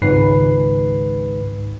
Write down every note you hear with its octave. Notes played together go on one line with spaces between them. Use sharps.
G#1 C#2 G#2 B4 C7